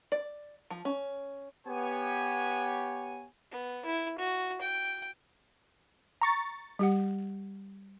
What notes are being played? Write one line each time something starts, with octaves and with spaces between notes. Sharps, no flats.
D5
F3
C#4
B3 G4 C#5 G#5
B3
E4
F#4
G5
A#5 C#6 A6
G3 G4 F#5